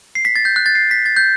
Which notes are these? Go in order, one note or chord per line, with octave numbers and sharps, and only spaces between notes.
C7
B6
A6
G6
F#6
A6
C7
B6
A6
G6